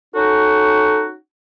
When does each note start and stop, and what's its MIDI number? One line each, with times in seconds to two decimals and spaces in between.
0.15 1.14 61
0.15 1.14 63
0.15 1.14 66
0.15 1.05 69